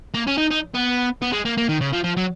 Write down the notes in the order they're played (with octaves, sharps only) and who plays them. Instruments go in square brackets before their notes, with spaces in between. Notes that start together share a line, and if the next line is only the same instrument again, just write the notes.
[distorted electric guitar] A#3
C#4
D#4
D#4
B3
B3
G#3
A#3
A#3
D#3
C#3
F3
F3
F#3